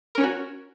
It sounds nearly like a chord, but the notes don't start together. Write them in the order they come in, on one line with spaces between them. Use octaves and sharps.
A#4 C#4 C#5 F#4